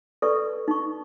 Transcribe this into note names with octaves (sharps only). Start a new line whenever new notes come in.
A4 B4 D5 C#6
D#4 C#6